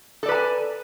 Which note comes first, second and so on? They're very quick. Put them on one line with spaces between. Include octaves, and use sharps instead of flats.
A4 D5 B4 A5 G#5